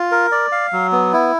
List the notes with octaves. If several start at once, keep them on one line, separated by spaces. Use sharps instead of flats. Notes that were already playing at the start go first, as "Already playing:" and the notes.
Already playing: F4
A#4
D5
F5
F#3
B3
E4